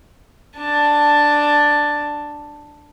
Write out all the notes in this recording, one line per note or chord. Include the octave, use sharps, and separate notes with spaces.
D4 A5